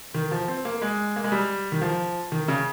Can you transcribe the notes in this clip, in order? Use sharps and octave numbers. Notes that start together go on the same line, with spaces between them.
D#3
F3
C4
A#3
G#3
A#3
G#3
G3
D#3
F3
D#3
C#3